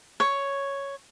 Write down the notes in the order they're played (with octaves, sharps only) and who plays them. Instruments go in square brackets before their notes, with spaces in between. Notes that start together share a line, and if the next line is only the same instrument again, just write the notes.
[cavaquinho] C#5